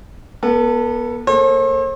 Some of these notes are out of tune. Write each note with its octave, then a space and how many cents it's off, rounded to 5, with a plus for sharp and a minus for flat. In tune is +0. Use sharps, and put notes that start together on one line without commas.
B3 -35 A4 +15
A#3 -20 A4 -25 C5 +45